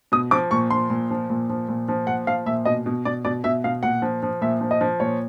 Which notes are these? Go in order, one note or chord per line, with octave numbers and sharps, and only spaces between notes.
B2 D#6
F3 D6
A#2 C#6
F3 C6
A#2
F3
A#2
F3
A#2
F3
A#2 F#5
F3 F5
A#2 E5
B2 D#5
B2
B2 D5
B2 D5
B2 E5
B2 F5
A#2 F#5
F3
F3
A#2 E5
F3
D#5
F3
A#2 C#5